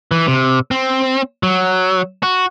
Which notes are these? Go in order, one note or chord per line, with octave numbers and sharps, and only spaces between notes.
E3
C3
C4
F#3
F#4